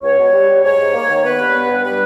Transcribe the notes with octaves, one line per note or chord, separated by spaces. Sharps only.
C#2 C#5
B2
G3
G3
G#2 C#5
G#2
A#3
D#3
B3 B4
G2
B3
G2
G3 B4